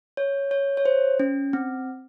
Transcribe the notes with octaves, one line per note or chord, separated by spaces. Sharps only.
C#5
C#5
C#5
C5
C#4
C4